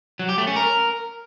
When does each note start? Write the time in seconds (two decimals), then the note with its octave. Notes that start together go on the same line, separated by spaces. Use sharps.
0.19 F#3
0.29 G4
0.38 A3
0.47 C#4
0.56 A#4